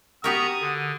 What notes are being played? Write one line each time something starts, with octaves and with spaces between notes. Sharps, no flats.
B3 F#4 G4 A#4 A#5 C#6 D#6
D3